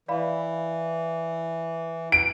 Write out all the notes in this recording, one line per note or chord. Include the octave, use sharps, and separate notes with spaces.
E3 D5 F5 B5
D7